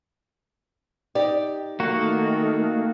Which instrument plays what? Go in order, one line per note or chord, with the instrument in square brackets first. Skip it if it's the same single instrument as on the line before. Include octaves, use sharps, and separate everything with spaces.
[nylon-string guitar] D#4 G4 D5
[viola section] D#3 A3 [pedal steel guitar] A#3 F#4